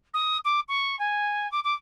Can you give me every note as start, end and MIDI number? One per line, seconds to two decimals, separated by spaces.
0.14 0.37 87
0.45 0.60 86
0.68 0.98 85
0.99 1.49 80
1.51 1.60 86
1.64 1.74 86